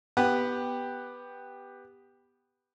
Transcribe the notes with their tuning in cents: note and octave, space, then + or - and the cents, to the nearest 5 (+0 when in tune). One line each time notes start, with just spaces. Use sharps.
B3 -5 G4 +10 F#5 +5